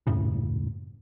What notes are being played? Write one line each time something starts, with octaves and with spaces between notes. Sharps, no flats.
D#1 F#2 A2 C#3